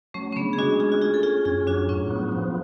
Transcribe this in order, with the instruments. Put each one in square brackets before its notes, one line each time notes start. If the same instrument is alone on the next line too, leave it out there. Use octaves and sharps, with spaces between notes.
[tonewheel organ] F#3 [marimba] A3 C#4
[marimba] C#4
[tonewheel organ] C#3 [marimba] B3 D4
[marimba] G#4
[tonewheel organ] G#3 [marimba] D4 F#4
[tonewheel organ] C#4 [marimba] F4 G#4
[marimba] F#4
[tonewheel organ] C#4 [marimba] F4 G#4
[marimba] A4
[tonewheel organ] C#4 [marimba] F4 G#4
[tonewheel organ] F#2 [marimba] F4 G#4
[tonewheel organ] F#3 [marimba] D4 F#4
[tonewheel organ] A2 [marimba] C#4 F4
[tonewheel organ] B3
F3